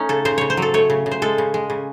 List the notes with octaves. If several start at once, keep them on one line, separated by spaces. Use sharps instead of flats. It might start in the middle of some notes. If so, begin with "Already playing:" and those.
Already playing: A3 C#4 D#4
C#3 A4
C#3 C5
C#3 C#5
C5
F#3 A4
A3 C#5
C#3
C#3
C5
G#3 A4
C#3
G#3
C#3